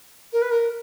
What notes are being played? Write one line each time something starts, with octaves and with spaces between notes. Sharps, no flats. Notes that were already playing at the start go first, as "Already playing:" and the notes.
A#4
B4
A#4